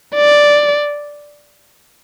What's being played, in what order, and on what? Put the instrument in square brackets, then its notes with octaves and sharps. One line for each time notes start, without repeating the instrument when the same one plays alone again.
[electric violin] D5